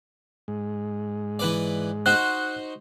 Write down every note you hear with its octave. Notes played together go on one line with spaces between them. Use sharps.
G#2 G#3
E3 B4 D5
D#4 F#4 C5 F#6